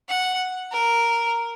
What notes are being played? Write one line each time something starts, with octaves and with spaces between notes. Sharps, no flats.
F#5
A#4